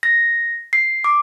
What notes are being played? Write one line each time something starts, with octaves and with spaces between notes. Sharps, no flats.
A#6
C7
D6